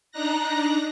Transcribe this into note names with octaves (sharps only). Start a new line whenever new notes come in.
D4 D#4 A#5 F#6 A#6